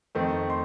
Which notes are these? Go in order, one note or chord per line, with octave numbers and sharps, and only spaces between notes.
F2 D#3 A3 C4
C6